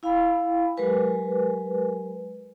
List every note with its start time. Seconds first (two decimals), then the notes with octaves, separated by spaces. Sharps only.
0.03 E4 F5 G5 B5
0.77 F#3 G#3 G4 A#4 B4 G#5